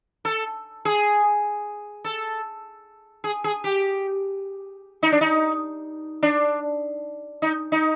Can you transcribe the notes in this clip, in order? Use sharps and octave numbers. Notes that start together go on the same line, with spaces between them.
A4
G#4
A4
G#4
G#4
G4
D#4
D4
D#4
D4
D#4
D#4